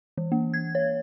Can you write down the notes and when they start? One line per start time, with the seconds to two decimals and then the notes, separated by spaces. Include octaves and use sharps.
0.18 E3
0.32 A#3
0.54 G#6
0.75 C#5